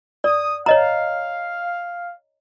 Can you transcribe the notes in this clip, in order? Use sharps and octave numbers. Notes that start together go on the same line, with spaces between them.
D5 D#6
C#5 D#5 F5 A#5